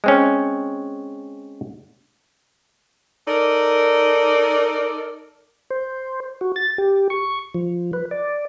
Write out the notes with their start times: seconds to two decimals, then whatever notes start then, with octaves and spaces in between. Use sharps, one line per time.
0.04 G#3 C4 C#4
3.28 D#4 A4 A#4 D5
5.71 C5
6.41 F#4
6.56 A6
6.78 G4
7.10 C#6
7.54 F3
7.93 B4
8.11 D5